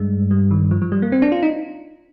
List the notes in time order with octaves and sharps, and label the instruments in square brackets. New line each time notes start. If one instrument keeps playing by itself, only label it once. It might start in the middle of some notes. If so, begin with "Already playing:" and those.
Already playing: [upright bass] G2 [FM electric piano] G#3
[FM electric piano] G3
D#3
F3
F3
G3
A#3
C4
D4
F4
D#4